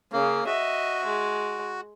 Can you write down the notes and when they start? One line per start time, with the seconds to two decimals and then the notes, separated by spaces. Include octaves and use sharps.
0.12 C#3 A#3 C#4
0.46 F#4 D#5 E5
1.05 G#3